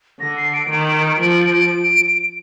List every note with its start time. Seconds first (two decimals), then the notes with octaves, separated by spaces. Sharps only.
0.20 D3 A#6
0.37 C7
0.54 D7
0.70 D#3 D7
1.20 F3 D7
1.44 D7